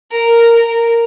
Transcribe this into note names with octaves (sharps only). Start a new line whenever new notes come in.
A#4
A#4